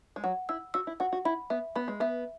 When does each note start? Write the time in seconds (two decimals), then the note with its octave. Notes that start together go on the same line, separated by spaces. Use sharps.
0.16 G#3
0.24 F#3 F#5
0.49 E4 E6
0.74 F#4 E6
0.87 E4
1.00 F#4 F#5
1.12 F#4
1.25 E4 B5
1.50 B3 E5
1.76 B3 B5
1.88 G#3
2.00 B3 E5